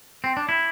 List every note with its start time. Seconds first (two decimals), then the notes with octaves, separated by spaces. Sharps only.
0.24 C4
0.37 D4
0.49 E4